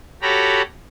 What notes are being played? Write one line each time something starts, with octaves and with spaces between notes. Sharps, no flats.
F#4 G4 A4 C#5 A#5 B5